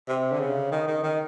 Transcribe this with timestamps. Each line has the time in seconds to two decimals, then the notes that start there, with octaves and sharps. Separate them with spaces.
0.08 C3
0.32 D3
0.40 C#3
0.72 D#3
0.88 D#3
1.03 D#3